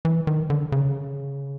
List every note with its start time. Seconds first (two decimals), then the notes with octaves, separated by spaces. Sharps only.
0.05 E3
0.27 D#3
0.50 D3
0.72 C#3